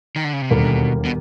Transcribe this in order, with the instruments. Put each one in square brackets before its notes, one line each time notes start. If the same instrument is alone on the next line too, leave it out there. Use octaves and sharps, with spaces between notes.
[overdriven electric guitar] D#3
D3
C#3
C3
[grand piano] E1 D#2 D3 G3 A#3 [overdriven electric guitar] B2
[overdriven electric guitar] B2